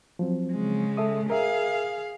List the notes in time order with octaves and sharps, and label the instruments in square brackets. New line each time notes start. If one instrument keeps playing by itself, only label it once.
[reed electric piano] F3 F#3 C4
[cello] C#3 G#3
[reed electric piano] A4 E5 D#6
[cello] G#4 F5 [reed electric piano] A#4 E5